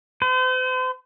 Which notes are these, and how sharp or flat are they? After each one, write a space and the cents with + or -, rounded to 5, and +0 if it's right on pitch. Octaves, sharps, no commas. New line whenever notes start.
C5 -40